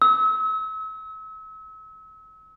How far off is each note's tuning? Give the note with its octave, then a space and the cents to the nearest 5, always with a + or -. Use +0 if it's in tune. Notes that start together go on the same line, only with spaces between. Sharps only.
E6 -40